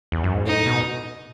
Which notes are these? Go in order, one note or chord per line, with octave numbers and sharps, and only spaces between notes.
E2
F#2
G#2
A2 D#4
B2